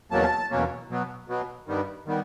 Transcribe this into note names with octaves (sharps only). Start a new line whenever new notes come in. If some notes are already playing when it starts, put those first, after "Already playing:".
E2 B2 F#3 A#3 C#4 A5
E2 B2 F#3 A#3 C#4
B2 F#3 B3
B2 F#3 B3
G2 D#3 G3 B3
D#3 G3 B3